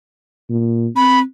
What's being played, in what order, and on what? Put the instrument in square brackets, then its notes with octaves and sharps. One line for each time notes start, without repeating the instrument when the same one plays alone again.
[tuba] A#2
[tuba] C4 [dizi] B5